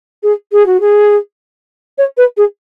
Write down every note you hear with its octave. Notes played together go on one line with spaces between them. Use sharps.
G#4
G#4
F#4
G#4
C#5
B4
G#4